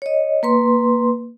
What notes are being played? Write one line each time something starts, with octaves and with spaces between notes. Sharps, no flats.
C#5 D#5
A#3 B4 C6